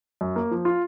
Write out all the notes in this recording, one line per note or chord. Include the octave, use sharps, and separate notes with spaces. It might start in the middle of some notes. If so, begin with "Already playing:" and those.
F#2
A#3
F3
F4